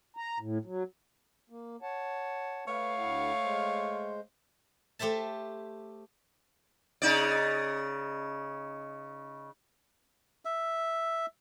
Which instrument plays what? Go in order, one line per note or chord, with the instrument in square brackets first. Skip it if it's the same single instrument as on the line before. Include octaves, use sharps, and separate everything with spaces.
[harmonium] A#5
A2
F#3
A#3
C#5 F#5 A5
[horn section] A3 C#5 F5 [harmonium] B4
[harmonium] D2 E4 F#5
G#3 C5
[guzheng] A3 G4 C5 E5 A5
[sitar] C#3 D#4 D5
[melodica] E5